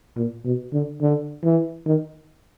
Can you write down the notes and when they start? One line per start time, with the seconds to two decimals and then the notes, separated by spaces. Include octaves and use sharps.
0.17 A#2
0.45 B2
0.73 D3
1.01 D3
1.44 E3
1.86 D#3